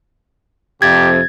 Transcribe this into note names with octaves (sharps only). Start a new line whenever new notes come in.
F2 C3 G4 G#6 A6